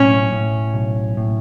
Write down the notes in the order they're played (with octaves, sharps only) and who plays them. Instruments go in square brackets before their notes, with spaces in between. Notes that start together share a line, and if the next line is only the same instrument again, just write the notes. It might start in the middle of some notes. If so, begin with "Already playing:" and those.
Already playing: [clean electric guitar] B1 A2 [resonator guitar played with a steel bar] C#4
[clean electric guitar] A2
B1
A2